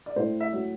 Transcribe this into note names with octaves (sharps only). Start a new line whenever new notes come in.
D5
A2 C5
E5
F#3